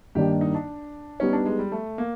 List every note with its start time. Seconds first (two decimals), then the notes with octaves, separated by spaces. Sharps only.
0.15 G2 D#3 G3 A#3 D4 G4
0.41 D#4
0.55 D4
1.20 G3 B3 C#4 D#4
1.33 D4
1.46 G#3
1.59 G3
1.72 A3
1.98 A#3